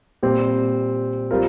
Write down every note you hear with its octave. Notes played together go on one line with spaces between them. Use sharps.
A#2 G3 C4 G4
G3 C4 F4 A#4